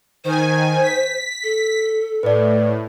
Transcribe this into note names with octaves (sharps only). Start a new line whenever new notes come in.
D#3 C5 G#5
B6
A4
A2 B4 D5